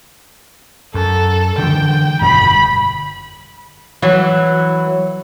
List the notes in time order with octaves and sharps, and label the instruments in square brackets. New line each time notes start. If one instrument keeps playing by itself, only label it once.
[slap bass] F#2 [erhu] A4
[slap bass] D3 E3 G#3 [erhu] G5
[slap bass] G1 F2 B2 [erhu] B5
[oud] E3 F#3